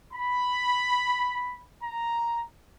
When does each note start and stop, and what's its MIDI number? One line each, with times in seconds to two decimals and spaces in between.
0.13 1.61 83
1.82 2.43 82